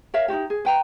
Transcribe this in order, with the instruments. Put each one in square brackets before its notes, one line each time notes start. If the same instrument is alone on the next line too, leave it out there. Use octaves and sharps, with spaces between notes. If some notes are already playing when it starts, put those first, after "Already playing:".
[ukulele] A#4 C#5 E5 F5
D#4 E4 F#4 G4
G#4
B4 G5 A#5